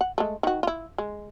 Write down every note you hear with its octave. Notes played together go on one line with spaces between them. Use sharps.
F#5
G#3 A3
D#3 F#4
E4 F4
G#3